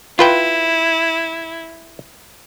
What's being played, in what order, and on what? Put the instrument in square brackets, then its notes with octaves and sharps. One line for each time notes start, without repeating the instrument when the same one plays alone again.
[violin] E4 [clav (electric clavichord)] F4 B4 G5